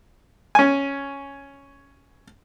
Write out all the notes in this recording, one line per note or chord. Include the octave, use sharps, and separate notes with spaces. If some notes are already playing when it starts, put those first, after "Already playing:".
C#4 G#5